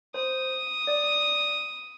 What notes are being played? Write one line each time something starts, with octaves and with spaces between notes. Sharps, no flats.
C5 D#6
D5